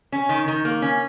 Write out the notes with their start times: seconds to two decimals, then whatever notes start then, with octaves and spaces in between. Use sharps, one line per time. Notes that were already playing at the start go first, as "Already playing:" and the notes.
0.12 C#4
0.29 D#3
0.48 D#3
0.65 A#3
0.82 C#4